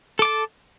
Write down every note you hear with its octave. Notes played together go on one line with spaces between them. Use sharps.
A4 A5 D6